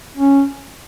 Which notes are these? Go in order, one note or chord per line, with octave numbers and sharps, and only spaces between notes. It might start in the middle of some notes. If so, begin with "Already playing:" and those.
C#4